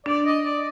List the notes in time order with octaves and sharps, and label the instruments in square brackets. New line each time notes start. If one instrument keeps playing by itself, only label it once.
[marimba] D4 [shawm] D5
[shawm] D#5
D5